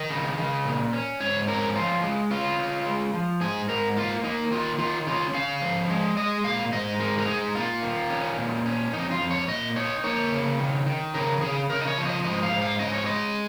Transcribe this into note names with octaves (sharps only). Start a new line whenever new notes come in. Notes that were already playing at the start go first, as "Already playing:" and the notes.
Already playing: D#3 D#5
C#3
C#3
A#2
C#4
G#2 C#5
C#4 A#4
F3 F4
G#3
C#4 F4
C#4
G#3
F3
G#2 G#4
G#2 A#4
A#3 F4
A#3 D#4
D#3 F4
D#3 F4
C#4 F4
C#4 F5
F3
G#3
G#3 D#5
A#2 F5
G#2 D#5
G#3 A#4
A#4
D#4 G#4
A#2 F4
D#3
C#4
A#2
C#4
F2 D#4
F4
F2
C#5
A#2 D#5
D#4 C#5
A#3 C#5
C#3
D#3
D#3
C#3 A#4
C#3 G#4
C#3 A#4
D#5
C#5
F3
D#5
G#2 D#5
F5
G#2
F5
C#4 D#5
C#5
G#3 D#5